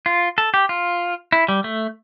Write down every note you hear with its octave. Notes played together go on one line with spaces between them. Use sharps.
F4
A4
G4
F4
E4
G3
A3